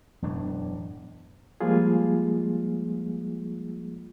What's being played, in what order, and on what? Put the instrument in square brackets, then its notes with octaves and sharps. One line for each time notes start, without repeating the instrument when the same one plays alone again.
[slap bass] E1 F#2 A2 D4
[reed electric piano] F3 G3 G#3 A#3 F4 G#4